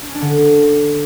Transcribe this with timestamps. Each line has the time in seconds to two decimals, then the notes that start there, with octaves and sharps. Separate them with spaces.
0.02 D4
0.08 C#4
0.15 D4
0.21 D3